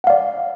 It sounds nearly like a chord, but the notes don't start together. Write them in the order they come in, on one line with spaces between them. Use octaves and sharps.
F#5 F5 D5